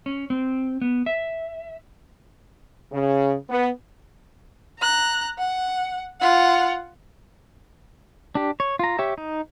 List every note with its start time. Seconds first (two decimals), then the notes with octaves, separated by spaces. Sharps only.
0.06 C#4
0.30 C4
0.81 B3
1.06 E5
2.91 C#3
3.49 B3
4.79 A#5 F#6
5.39 F#5
6.21 F4 F#5
8.35 D4 G4
8.60 C#5
8.79 F4 A#5
8.99 G4 C#5 E5
9.18 D#4